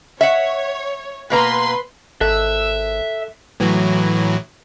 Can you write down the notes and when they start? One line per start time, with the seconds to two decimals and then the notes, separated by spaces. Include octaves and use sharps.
0.21 C#5 E5 F#5
1.30 B2 A#3 B4 A#5 C6
2.21 G#1 A4 E5 F#6
3.60 A2 E3 F#3